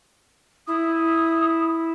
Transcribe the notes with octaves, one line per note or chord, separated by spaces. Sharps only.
E4 D#6